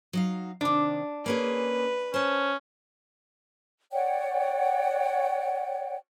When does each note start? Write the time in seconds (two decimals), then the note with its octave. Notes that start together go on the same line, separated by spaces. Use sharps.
0.13 F#3 D#4 F5
0.61 C3 D#3 D4
1.26 A#3 C#4 G#4 B4
2.14 C#4 C5 A5
3.92 C#5 D5 F#5 G5